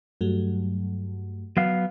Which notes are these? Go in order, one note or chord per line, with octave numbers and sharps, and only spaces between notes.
G2 F#3 A3
F#3 B3 F5